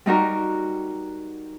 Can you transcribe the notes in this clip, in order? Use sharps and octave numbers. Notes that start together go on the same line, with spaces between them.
G3 D#4 F#4 A#4